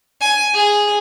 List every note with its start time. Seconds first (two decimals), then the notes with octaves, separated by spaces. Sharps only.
0.21 G#5
0.55 G#4